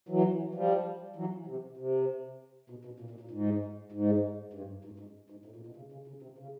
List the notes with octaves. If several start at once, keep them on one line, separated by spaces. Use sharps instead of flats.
E3 F#3
F3 G3
E3 F#3
C3
C3
B2
B2
A#2
A#2
A#2
G#2
G#2
G2
G#2
G#2
G#2
A2
A#2
B2
C#3
C#3
C#3
C3
C#3